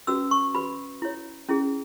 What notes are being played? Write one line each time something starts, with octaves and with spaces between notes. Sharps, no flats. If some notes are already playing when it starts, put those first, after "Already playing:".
C#4 F#4 B4 E6
C#6
F#4 B4 B5
E4 C#5
C#4 E4 G#4